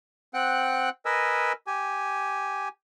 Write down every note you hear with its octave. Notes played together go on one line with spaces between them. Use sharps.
C4 F#5 G5 F#6
A#4 B4 D#5 G#5 E6
G4 G#5